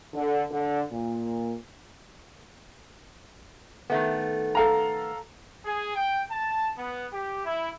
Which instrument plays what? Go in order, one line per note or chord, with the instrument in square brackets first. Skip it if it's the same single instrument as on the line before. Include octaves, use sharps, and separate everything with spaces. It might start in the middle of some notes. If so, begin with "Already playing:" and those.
[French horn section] D3
D3
A#2
[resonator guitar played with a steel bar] D#3 A3 B3
[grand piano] A4 F5 A#5
[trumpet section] G#4
G5
A5
B3
G4
E4